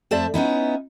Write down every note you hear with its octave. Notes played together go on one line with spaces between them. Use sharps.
F2 A3 C5 D5 E5 A5
B3 C#4 D#4 E4